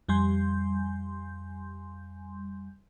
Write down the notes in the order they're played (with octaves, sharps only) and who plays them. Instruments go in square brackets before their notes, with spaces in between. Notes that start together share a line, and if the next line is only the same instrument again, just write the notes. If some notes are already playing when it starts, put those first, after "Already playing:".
[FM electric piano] F2 G3 G#5 C6 G6